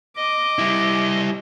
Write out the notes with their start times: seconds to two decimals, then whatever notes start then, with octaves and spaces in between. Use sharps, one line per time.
0.16 D#5 D6
0.59 G3 E4